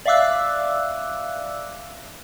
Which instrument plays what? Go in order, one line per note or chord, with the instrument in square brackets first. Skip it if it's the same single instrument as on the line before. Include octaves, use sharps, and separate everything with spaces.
[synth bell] D5 E5 F5 D6 E6 F#6